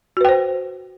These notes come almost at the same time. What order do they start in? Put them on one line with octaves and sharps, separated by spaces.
F#4 B4 G5 C5